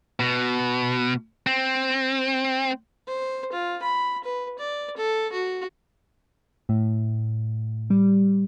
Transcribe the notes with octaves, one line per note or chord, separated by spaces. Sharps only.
B2
C4
C5
F4
B5
B4
D5
A4
F#4
A2
G3